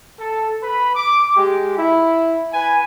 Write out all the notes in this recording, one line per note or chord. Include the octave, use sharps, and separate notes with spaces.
A4
B4 B5
D6
G#3 G4
E4
B4 G#5